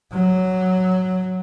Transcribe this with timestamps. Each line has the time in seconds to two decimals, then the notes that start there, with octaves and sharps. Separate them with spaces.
0.13 F#3